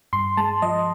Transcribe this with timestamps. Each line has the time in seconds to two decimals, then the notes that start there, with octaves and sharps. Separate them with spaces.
0.13 G2 C6
0.37 G#3 A5
0.62 F3 D#5